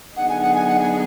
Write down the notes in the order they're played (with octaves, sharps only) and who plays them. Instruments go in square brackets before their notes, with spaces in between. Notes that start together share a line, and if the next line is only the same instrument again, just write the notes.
[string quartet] D3 F#3 B3 D#4 G#4 [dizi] F#5
[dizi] G#5
F#5
G#5
F#5
G#5